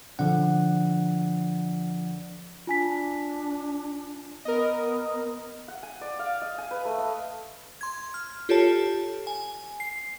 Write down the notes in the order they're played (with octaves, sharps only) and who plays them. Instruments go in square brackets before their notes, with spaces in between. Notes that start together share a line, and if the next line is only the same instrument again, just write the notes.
[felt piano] D3 [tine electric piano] F3 F#5
[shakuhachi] D4 [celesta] F4 G#5 B6
[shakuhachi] B3 [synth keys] A#4 D#5
[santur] F#5
G#5
D5
F5
D#5
G#5
B4
A3
D#5
[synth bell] C6 G#6
F6
F4 G4 A4 C#5 A5
G#5
C7